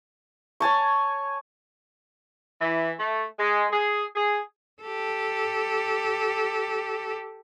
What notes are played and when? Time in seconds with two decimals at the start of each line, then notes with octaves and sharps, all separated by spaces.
0.60 C#5 G#5 A5 C#6
2.61 E3
2.99 A3
3.39 G#3
3.71 G#4
4.16 G#4
4.82 G4 A4